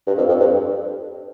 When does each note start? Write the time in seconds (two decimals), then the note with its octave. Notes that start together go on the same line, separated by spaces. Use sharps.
0.07 G2
0.18 F2
0.28 F2
0.40 G2